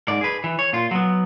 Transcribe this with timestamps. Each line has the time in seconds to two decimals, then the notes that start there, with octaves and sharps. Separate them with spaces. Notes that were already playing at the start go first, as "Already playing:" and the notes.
0.08 G#2 D5
0.21 G#4 B4
0.44 E3
0.59 C#5
0.73 A#2 F4
0.91 F#3 B3